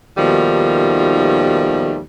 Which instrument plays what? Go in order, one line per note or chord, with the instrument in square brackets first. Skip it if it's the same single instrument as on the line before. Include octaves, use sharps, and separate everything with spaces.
[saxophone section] D#2 B2 D#3 F3 G3 A3